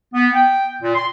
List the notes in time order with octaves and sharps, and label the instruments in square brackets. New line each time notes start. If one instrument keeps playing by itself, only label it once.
[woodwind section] B3
G5
A#2
C6